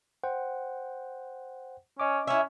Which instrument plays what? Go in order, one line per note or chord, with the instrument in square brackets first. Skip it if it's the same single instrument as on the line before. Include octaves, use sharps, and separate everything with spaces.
[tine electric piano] C5 F#5 G5
[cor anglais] C#4 [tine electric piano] D#5 D6
[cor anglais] C#4 [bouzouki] E4 E5